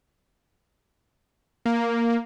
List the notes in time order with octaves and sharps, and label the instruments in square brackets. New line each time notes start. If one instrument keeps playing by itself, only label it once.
[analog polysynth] A#3